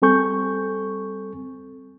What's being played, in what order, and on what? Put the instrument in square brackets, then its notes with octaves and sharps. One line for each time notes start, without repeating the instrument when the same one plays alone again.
[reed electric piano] G3 C4 A4 G#5 C#6 G6